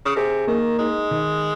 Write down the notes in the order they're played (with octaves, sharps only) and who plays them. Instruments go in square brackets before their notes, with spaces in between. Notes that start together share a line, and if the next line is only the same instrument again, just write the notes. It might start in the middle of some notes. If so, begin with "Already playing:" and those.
[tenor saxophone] C#3
[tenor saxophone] C3 [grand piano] G#4
[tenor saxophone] D#3 [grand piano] A#3
[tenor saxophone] G#3 [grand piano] D#4
[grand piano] D#3